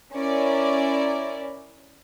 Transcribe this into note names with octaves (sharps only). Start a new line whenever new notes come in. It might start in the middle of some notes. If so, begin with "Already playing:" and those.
C#4 E4 A#4 D5